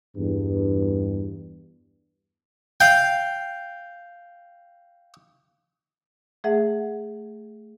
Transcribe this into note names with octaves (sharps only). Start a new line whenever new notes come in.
E2 G2
F5 G5
A3 G#4 E5 F#5